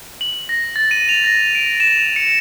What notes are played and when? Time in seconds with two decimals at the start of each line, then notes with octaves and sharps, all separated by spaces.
0.21 F#7
0.49 A#6
0.76 A6
0.91 D#7
1.09 F7
1.24 A#6
1.55 D7
1.80 E7
2.16 C#7